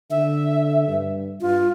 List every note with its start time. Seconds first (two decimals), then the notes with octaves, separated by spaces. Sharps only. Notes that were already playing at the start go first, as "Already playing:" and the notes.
0.11 D3 E5
0.87 G2
1.41 G2 F4